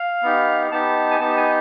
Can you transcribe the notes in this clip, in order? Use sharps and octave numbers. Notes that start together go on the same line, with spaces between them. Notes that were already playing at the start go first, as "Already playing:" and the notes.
Already playing: F5
B3 D#4 G4
B3 D#4 G4 A5
G#5
B3 D#4 G4 A5
G#5